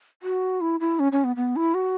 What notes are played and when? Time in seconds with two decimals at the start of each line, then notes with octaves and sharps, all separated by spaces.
0.22 F#4
0.61 E4
0.80 E4
0.99 C#4
1.12 C#4
1.24 B3
1.36 B3
1.56 E4
1.74 F#4